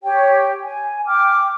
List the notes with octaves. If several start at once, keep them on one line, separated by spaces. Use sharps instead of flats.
G4 C#5 G5
G#5
G5 D6 F6